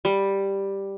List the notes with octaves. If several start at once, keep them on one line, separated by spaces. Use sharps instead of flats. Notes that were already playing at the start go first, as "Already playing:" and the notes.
G3